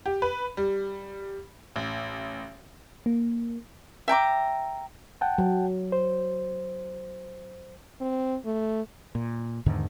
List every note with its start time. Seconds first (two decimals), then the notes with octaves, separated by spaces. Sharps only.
0.06 G4
0.22 B4
0.57 G3
1.76 A1
3.06 A#3
4.08 E5 G5 A#5 D6
5.21 F#5 G5 A5
5.38 F#3
5.92 C5
8.01 C4
8.45 A3
9.15 A#2
9.66 E2 G#2 D3 D#3